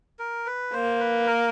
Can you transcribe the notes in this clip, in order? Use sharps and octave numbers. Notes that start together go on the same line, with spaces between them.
A#4
B4
A#3 C5
B4
A#4